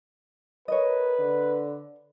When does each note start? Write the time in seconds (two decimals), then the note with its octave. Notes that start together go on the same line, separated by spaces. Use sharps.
0.68 A#4 B4 C#5 D#5
1.19 D3